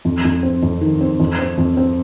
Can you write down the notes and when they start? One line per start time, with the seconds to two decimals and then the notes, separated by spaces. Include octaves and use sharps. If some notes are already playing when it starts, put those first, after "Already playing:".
0.05 F2
0.25 F2
0.43 C4
0.63 F2
0.81 D#3
1.01 C4
1.20 F2
1.39 C4
1.58 F2
1.77 C4